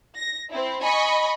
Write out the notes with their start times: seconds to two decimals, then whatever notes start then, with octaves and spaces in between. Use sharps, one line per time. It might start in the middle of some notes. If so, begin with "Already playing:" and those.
0.16 A#6
0.50 C4 E4
0.82 D#5 G#5 B5 C#6